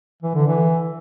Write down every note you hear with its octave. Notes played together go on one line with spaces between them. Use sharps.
E3
D3
E3